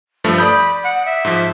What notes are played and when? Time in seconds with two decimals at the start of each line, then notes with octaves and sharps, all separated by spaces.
0.24 G2 F3 A3
0.38 D5 B5 D#6 G6
0.84 F#5
1.05 E5
1.25 G#2 F3